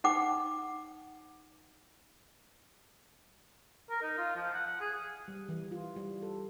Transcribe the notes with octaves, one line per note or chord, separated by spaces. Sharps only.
D#4 F#5 G5 D6
A#4
D#4
F4
F3
F#5
F#5
G#4
G3
E3
F4
G3
A4